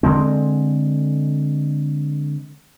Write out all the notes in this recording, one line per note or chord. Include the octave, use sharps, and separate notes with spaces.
D3 G#3 C4